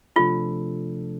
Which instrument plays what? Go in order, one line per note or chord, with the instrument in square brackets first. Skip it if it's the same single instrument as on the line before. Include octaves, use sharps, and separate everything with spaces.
[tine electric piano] C3 F3 A3 D4 A4 [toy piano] F4